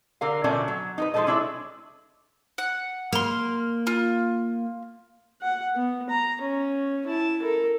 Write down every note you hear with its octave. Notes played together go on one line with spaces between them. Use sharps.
D3 A#4 F5
B2 D3 F3 A3 C#4 D4
F#3
D#4 A#4 B4
F3 G#3 C4 D#4 A4 D#5
G#3 D4 E4 A4 C#5 E5
F#5
A#3 C6 F6
F4
F#5
B3
A#5
C#4
E4 A5
A4 A#4